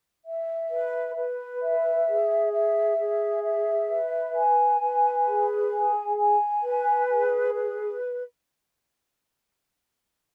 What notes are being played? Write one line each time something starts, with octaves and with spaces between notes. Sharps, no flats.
E5
B4
B4
E5
G#4
E5
G#4
E5
B4
G#5
B4
G#4
G#5
G#5
B4
G#4
B4